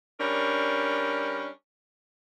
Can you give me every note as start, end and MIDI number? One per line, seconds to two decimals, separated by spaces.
0.20 1.47 55
0.20 1.47 61
0.20 1.47 62
0.20 1.47 70